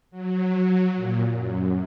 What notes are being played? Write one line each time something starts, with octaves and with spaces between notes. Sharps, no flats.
F#3
A#2
F#2